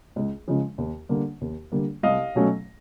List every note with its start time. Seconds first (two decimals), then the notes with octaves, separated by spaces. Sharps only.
0.16 C#2
0.48 C#3 F3 G#3
0.78 D#2
1.09 D3 G3 A#3
1.41 D#2
1.72 D3 G3 A#3
2.03 C2 D#5 F5
2.35 B2 F#3 A3 C#4